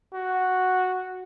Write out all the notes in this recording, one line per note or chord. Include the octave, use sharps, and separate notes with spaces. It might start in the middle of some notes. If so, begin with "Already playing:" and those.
F#4